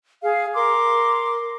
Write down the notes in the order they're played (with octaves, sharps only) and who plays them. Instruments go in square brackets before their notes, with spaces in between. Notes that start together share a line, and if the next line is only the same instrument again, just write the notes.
[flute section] G#4 F5
A#4 C6 D6